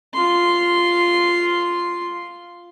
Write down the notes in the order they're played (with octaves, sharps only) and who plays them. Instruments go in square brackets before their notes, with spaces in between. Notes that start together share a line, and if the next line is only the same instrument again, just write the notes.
[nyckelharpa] F4 C6